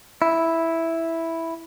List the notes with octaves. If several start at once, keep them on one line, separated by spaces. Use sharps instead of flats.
E4